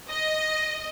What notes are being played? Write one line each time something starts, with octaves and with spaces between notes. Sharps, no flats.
D#5